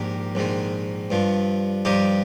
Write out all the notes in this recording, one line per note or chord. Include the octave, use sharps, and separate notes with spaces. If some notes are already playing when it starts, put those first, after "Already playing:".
Already playing: A#1 G#2 D#3 G4 A#4
A#1 G#2 D#3
G2 F3
G2 F3 D#4 G4